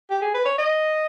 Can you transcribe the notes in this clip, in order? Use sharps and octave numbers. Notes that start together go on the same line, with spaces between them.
G4
G#4
B4
C#5
D#5